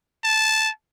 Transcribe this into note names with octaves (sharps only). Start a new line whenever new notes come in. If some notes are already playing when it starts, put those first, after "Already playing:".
A5